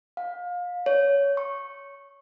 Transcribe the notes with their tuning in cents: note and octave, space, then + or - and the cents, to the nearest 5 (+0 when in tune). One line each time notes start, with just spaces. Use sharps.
F5 +30
C#5 +15
C#6 -15